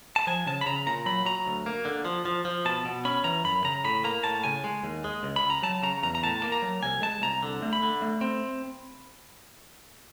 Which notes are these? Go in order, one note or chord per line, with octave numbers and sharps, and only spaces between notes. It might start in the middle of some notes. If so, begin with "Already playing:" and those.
A5
F3 G#5
C#3 A5
B5
C#3 A#5
A#2 A#5
F#3 B5
F#3 A#5
D2
A#3
D3
F3
F3
F3
B2 A5
B2
C#4 B5
E3 A#5
F#2 B5
C#3 A#5
A2 B5
A#3 A#5
A2 A5
C#3 G#5
G#3
D#2
G#3
C#2
B5
C#2
A#5
F#3 A5
C#3 A#5
E2 A#5
A#5
A2 A5
A#3
A#5
F#3
C2 G#5
G#3 A5
C2 A#5
D3
A3
B5
D3
A3
C4